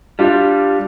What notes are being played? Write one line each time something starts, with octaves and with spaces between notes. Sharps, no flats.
G3 D4 F4